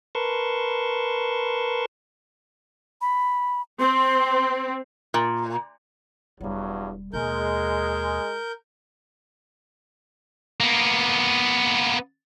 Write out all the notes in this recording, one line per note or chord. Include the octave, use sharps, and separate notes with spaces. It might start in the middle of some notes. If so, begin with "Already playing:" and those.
A#4 B4 A5 C6 C#6
B5
C4 C6
A#2
E1 E2 G2 F#3 G3
D#2 B2 G#3 A#4 G6
A#3 B3